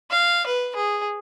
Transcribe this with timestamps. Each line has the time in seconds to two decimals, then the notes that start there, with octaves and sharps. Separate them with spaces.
0.11 F5
0.47 B4
0.76 G#4